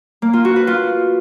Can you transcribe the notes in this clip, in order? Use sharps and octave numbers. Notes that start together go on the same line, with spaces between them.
A#3
F4
F#4
B4
F4